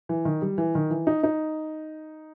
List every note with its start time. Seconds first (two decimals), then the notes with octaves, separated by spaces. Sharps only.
0.09 E3
0.25 D#3
0.42 G3
0.58 E3
0.75 D#3
0.90 E3
1.07 D#4
1.23 D#4